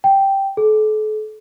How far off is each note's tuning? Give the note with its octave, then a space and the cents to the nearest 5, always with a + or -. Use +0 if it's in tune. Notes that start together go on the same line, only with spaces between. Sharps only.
G5 -5
A4 -40